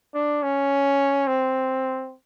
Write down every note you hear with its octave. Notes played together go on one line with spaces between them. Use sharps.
D4
C#4
C4